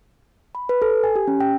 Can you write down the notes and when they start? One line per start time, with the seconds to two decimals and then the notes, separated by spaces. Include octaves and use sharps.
0.55 B5
0.69 B4
0.82 A4
1.04 G#5
1.16 G4
1.27 C#4
1.40 G5